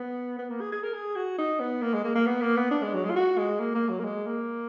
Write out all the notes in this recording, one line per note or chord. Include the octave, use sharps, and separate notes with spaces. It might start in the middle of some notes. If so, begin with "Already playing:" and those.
Already playing: B3
B3
A#3
G#4
G#4
A#4
G#4
F#4
D#4
B3
A#3
G#3
A#3
A#3
B3
A#3
B3
D4
G#3
F#3
G#3
F4
F#4
G#3
A#3
A#3
F#3
A#3
G#3
A#3